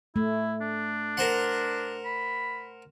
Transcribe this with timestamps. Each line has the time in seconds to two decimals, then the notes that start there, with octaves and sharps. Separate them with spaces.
0.16 A3 E4
0.61 D4
1.17 A#4 C5 F#5
2.05 B5